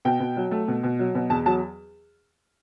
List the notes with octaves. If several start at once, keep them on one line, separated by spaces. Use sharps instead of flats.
B2 G5
B2
F#3
A3
B2
B2
F#3
B2
E2 A5
F#3 A5